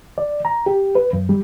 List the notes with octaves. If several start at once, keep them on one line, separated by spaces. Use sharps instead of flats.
D5
A#5
G4
B4
F#2
G3